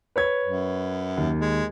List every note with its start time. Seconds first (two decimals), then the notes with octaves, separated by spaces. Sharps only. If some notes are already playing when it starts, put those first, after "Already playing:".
0.16 B4 C#5 G#6
0.44 F#2
1.17 D#2
1.39 G#3